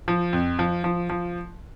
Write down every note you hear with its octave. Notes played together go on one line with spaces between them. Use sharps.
F3
F2
F3
F3
F3